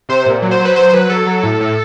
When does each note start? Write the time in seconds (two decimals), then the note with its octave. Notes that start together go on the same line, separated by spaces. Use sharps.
0.09 C3 C5
0.26 A#2
0.42 F#3
0.51 C5
0.60 F#3
0.65 B4
0.76 F#3 C5
0.93 F#3 B4
1.09 F#3 A4
1.26 F#3
1.43 A2
1.60 A2